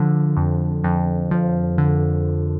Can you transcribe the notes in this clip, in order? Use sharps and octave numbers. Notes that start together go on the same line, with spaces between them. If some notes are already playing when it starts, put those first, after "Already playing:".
Already playing: D3 F3
F2
F2
F3
D3